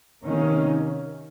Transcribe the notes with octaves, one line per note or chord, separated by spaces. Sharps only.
C3 D#3 A#3 C#4